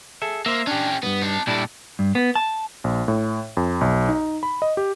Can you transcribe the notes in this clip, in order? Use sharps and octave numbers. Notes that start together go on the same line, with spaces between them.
G#4 A4 E5
A#3 C5 E5
C#4 D4 G4
B1 G2 B3
D#4 A5
A#2 G3 D4 E4 A4
G2
B3
A5
A#1
A2
F2
B1
D#4
B5
D#5
G4